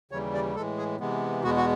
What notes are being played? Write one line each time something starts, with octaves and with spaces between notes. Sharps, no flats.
D#2 C#3 E3 G3 C#5
D5
A2 E3 G#3 A4
G#4
C3 E3 G#3 B3
E2 B2 G#3 B3 F#4
F#4